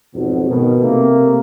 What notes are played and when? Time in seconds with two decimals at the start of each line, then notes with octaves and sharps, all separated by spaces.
0.14 F2 G#2 B2 F#3
0.48 B2 D#3
0.81 C3 A3 A#3